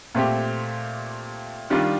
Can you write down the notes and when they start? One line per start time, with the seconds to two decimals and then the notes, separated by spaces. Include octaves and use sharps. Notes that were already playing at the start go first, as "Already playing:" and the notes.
0.15 A#2 A3 C4 G4
1.70 D#3 G3 D4 F4